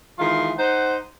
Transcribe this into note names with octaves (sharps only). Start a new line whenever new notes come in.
D#3 E3 G#3 F4 C6
D#4 C5 F#5